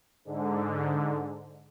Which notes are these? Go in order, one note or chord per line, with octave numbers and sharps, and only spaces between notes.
G#2 D3